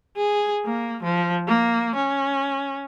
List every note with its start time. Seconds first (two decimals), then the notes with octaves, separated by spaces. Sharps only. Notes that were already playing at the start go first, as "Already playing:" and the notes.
0.17 G#4
0.66 A#3
1.03 F3
1.48 A#3
1.96 C#4